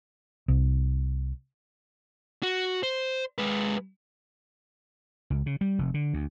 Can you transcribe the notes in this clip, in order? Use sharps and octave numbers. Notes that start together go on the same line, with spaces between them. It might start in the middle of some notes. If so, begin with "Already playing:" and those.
C2
F#4
C5
G#3 B4
C#2
C#3
G3
F1
D3
D2